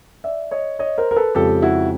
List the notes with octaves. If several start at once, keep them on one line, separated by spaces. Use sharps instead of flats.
D5 E5
C#5 D#5
C#5 D#5
A#4 C5
A#4
A4 B4
F2 C#3 F3 G#3 G4 A4
E4 F#4